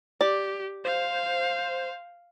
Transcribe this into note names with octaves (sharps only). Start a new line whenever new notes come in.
G4 D5
C5 F5